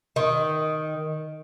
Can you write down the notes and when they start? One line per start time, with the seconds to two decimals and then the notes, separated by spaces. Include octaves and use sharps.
0.16 D#3